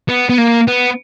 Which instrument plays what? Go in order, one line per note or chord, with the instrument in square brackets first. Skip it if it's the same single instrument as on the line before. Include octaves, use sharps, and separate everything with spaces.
[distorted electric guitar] B3
B3
A#3
B3